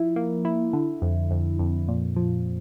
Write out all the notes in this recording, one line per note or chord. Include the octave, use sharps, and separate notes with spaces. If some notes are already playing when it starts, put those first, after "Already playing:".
Already playing: F3 E4
A#3
E4
D3
F2
F2
F2
A#2
F3